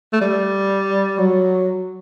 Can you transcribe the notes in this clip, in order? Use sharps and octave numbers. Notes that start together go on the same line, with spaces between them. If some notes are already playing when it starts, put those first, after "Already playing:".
A3
G3
F#3